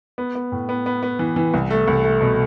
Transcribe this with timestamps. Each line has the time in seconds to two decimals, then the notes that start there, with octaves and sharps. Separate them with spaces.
0.18 B3
0.35 B3
0.52 A2
0.69 B3
0.86 B3
1.03 B3
1.19 E3
1.36 E3
1.54 C2
1.70 A3
1.88 C2
2.04 A3
2.21 B2